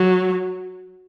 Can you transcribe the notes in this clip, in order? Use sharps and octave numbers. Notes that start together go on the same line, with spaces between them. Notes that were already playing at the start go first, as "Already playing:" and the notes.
Already playing: F#3